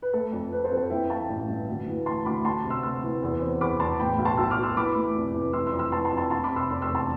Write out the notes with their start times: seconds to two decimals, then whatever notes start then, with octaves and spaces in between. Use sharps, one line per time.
0.02 B4
0.13 A3 A4
0.33 F2
0.52 C4 B4
0.64 A4 C5
0.71 F2
0.77 A4 C5
0.90 E3 E5 G5
1.10 E3 F5 A5
1.29 A1
1.49 G2
1.68 D2
1.88 E3
2.06 A3 A5 C6
2.25 D2 B5 D6
2.44 A3 A5 C6
2.64 C3
2.70 C6 E6
2.83 A3 C6 E6
3.03 E3
3.23 E2
3.41 C4
3.61 E2 B5 D6
3.79 E2 A5 C6
3.99 A2 G5 B5
4.18 B1
4.25 A5 C6
4.37 B1 C6 E6
4.51 D6 F6
4.58 B1
4.63 C6 E6
4.77 E3 B5 D6
4.95 A3
5.15 F1
5.34 E3
5.53 E3 C6 E6
5.67 C6 E6
5.73 F2
5.79 C6 E6
5.92 E3 A5 C6
6.05 A5 C6
6.12 F2
6.17 A5 C6
6.30 F1 A5 C6
6.44 B5 D6
6.50 C3
6.56 C6 E6
6.70 F1 C6 E6
6.82 C6 E6
6.89 E2
6.95 A5 C6